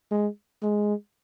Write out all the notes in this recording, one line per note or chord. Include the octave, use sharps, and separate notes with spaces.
G#3
G#3